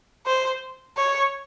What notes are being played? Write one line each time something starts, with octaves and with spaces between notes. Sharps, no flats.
C5
C#5